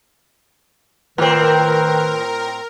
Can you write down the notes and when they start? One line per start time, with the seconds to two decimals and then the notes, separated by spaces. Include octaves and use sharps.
1.18 A2 D#3 C4 A#4 B4